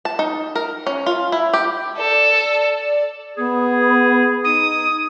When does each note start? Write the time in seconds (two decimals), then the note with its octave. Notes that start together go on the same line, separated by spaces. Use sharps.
0.05 A5
0.19 D#4
0.55 A#4
0.87 C#4
1.06 F4
1.32 E4
1.54 G4
1.97 A4 D5
3.37 B3 G#4
4.44 D#4 D#6